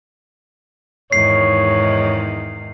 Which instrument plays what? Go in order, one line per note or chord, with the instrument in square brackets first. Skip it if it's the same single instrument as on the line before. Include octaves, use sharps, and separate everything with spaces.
[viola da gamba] E2 G#2 D#3 [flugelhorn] C#5 [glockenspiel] C7